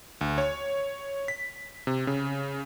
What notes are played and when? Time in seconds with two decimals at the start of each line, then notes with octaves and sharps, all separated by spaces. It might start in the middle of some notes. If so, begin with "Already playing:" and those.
0.21 D2
0.38 C#5
1.28 B6
1.87 C3
2.07 C#3